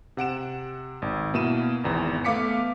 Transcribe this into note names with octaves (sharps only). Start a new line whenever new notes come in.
C3 F#5 D7 E7
G#1
B2 A#3 E4 D#7 E7
G#1 E2 E3
A3 B3 F5 D6 B6 C#7